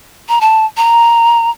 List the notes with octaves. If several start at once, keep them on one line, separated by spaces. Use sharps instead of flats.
A#5
A5
A#5